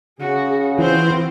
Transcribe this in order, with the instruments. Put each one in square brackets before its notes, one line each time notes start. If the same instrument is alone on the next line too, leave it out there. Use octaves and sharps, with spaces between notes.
[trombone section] C#3 [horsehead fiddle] F#4 G#4
[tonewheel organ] E3 [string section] B3 C4 C5 [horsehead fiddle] F4 F#4